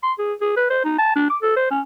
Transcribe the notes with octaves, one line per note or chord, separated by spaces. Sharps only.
C6
G#4
G#4
B4
C5
D#4
A5
D4
D6
A4
C5
C#4